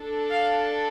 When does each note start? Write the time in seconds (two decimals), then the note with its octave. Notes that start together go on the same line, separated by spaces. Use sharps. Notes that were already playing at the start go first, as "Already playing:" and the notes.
Already playing: D4 A4
0.30 F5